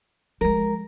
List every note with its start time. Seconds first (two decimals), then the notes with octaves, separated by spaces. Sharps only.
0.41 F3 G#3 A#4